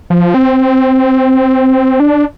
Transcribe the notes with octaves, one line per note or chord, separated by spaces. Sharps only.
F3
C4
D4